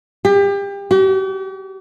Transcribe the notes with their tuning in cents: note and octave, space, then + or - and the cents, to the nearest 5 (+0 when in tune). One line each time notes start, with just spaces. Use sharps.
G4 +30
G4 -45